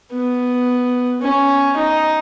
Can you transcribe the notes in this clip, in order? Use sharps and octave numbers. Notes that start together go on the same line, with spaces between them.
B3
C#4
D#4